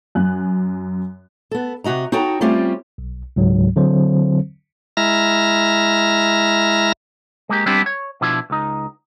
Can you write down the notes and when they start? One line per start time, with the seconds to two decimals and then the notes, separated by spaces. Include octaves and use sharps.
0.15 F#2 G#5 F#6
1.51 B3 A4
1.84 C3 F#4 D#5 A#5
2.12 D#4 F#4 A4 C#5 G5 A#5
2.41 G3 A3 C4 C#4 F4 G4
2.98 B1
3.36 C#2 G#2 F#3
3.76 D3 F#3 C4 C5
4.97 G#3 E4 E5 A#5 F6 A#6
7.49 G#3 A#3 G4
7.66 G3 B3 C4 D4 E4 G4
7.86 C#5
8.21 B2 F3 D4 E4
8.50 C#2 D#4